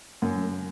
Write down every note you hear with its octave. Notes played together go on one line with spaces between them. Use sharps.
F#2